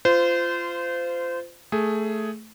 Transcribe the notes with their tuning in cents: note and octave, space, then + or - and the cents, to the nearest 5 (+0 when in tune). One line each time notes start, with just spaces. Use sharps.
F4 -15 C5 -25
A3 +0 G#4 +10